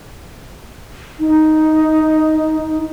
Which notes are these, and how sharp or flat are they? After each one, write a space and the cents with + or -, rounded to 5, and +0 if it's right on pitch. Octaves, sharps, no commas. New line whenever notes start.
D#4 +5